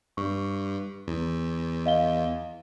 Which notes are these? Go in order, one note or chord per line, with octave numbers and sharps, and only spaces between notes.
G2 C#6
E2
D#5 F5 G7